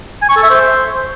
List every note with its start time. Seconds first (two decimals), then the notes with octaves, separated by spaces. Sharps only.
0.22 G#5
0.29 C#6
0.36 A4
0.43 E5
0.50 C5